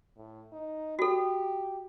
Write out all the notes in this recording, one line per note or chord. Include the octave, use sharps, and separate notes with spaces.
A2
D#4
F#4 G4 A4